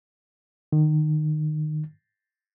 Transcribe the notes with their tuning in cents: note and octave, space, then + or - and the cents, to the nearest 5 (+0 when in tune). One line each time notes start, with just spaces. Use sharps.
D#3 -25